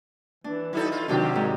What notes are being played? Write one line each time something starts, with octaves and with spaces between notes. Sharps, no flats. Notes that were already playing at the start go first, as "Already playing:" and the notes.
E3 D4
F#3 D#4 E4 A4
F4
D#2 C3 D#3 F#3 D4 G4
G#2